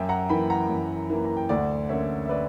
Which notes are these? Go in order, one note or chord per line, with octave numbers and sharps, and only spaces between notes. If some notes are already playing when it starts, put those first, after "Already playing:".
Already playing: F#2 E5 G5
F#5 A#5
E3 A#3 G5 B5
F#5 A#5
F#2
E3 A#3
A#5
G5
D2 D5 F#5
D3 A#3 C#4 C#5 E5
E5
B4 D5